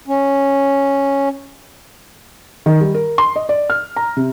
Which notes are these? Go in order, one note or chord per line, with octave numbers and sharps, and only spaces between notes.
C#4
D#3
G3
A#4
C6
D#5
D5
F6
A#5
C3